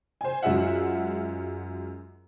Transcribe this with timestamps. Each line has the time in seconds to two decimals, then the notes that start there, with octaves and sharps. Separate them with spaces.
0.21 C5 G#5
0.43 F#2 G#3 F4 E5 F#5